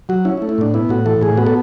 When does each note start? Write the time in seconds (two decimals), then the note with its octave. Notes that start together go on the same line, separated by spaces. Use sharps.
0.09 F#3 F#4
0.25 C#4 E4
0.37 E4
0.42 A3
0.49 E4
0.58 A2 D4
0.74 B3 E4
0.89 A2 F#4
1.06 E3 A4
1.21 A2 G#4
1.37 B3 F#4
1.47 A4